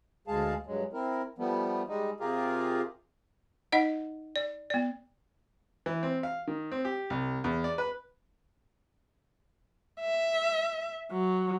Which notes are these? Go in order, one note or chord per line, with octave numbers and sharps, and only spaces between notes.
D2 G#3 G#4 F5 A5
G2 F#3 G#3
C4 E4 A#4
F3 G3 A3 B3
G3 G#3 D#4
C3 F4 G4 G#4 A#4
D#4 D#5 F#5
D5
B3 D5
E3
C4
F5
D#3
C4
G4
C2
E2
D5
B4
E5
F#3